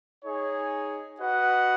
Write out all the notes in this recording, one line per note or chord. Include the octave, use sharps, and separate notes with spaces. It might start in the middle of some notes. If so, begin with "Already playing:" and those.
D#4 G#4 C#5
F#4 B4 D#5 F#5